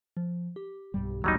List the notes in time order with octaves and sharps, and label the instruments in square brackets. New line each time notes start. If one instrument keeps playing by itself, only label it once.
[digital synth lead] F3
G4
[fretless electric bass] B1 G2 G3
[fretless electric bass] D#1 A#1 E2 [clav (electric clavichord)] F#3 G3 D#4